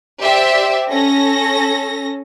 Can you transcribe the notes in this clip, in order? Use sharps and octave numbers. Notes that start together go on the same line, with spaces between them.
G4 C5 D5 E5
C#4 A4 A#6